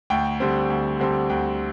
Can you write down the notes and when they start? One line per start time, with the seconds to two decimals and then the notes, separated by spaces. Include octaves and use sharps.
0.10 D2 G5
0.40 D3 G3 C4
0.70 D2
1.00 D3 G3 C4
1.30 D2 G5